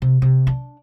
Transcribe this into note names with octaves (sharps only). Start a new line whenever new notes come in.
C3
C3
D4